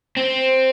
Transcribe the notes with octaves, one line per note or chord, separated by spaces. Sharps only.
C4